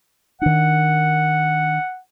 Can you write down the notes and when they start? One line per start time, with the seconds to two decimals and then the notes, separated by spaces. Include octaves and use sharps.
0.41 D#3 D4 F#5